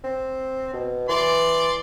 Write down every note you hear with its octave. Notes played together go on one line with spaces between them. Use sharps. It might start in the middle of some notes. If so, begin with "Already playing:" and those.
C4
B2
E3 D5 C6